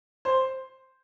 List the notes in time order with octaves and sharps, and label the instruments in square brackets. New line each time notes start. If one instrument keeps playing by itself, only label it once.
[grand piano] C5